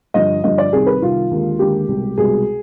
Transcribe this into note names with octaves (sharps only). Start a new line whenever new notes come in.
G2 D3 F3 D#5
G2 D3 F3 D#5
D5
C2 C3 D#3 G#4
B4
C2 C3 D#3 F4
D#2 D3 G#3
D#2 D3 G#3 G4
C2 B2 G#3
C2 B2 G#3 G#4